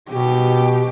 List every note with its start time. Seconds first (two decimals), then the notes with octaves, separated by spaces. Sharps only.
0.10 B2 G4